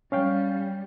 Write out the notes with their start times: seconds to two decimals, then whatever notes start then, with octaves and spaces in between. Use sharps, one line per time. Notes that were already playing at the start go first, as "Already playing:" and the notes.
0.12 G3 C#4 F5 G5